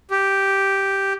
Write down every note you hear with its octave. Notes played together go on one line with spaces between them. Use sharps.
G4